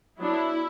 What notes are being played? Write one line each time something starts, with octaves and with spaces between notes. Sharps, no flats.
F#3 B3 D4 E4